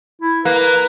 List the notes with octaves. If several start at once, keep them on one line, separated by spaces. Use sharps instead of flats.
E4
A#3 B4